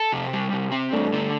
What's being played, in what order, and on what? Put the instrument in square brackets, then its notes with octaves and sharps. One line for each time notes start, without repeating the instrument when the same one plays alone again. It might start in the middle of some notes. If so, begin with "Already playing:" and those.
Already playing: [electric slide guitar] A4
C3
G3
C3
C4
[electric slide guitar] G2 [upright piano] A3 D4
[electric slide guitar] D3